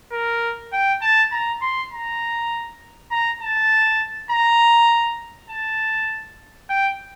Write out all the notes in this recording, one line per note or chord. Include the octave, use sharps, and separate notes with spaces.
A#4
G5
A5
A#5
C6
A#5
A#5
A5
A#5
A5
G5